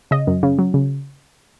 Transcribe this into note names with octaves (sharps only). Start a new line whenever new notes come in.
C#3 D#5
F#2
C#3
F#3
C#3